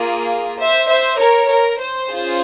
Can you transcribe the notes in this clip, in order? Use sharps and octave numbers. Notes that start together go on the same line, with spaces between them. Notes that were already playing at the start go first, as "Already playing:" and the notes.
Already playing: A#3 F4 G#4
C5 E5
C5 E5
A#4 C#5
A#4
C5
C#4 F4 G#4